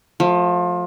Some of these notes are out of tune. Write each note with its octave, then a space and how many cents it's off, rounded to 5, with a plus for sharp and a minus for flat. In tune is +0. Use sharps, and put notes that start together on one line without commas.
F3 +25 A3 -10